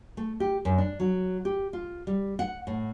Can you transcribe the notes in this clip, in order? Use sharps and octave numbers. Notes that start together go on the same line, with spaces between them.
A3
G4
F#2
D4
F#3
G4
F4
G3
F#5
A2